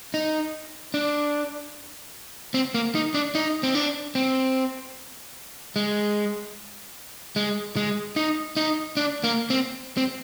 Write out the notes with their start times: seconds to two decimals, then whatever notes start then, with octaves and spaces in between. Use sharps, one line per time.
0.14 D#4
0.94 D4
2.54 C4
2.74 A#3
2.95 D#4
3.14 D4
3.35 D#4
3.63 C4
3.75 D4
4.15 C4
5.76 G#3
7.36 G#3
7.76 G#3
8.16 D#4
8.57 D#4
8.97 D4
9.24 A#3
9.50 C4
9.97 C4